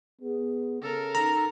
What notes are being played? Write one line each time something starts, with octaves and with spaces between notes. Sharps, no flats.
B3 G#4
C#3 A4 A#4
D#4 A#5